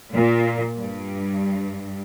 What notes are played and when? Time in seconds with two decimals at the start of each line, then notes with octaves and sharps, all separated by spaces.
0.12 A#2
0.79 G2